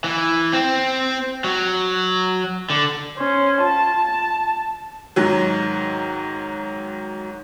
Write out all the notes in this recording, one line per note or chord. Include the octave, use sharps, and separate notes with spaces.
E3
C4
F#3
D3
C#4 C5
F4 A5
A5
G#2 D#3 F#3